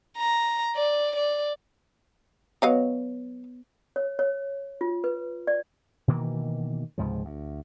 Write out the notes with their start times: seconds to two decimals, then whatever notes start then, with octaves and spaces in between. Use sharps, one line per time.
0.18 A#5
0.76 D5
1.16 D5
2.62 F#3 B3 B4 C#5 D#5 F5
3.96 C#5
4.19 C#5
4.81 F4
5.04 B4
5.47 D5
6.08 B2 D#3 E3 A#3
6.98 C#2 G#2 C3 F3
7.25 D2